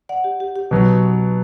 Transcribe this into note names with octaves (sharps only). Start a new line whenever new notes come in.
D5 F#5
G4
G4
G4
B2 F#3 B3